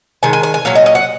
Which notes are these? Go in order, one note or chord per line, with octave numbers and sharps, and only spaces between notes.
D#3 G#3 G#5
G#5
G#5
G#5
A#2 F#3 C#4 F5
D#5
D#5
F#5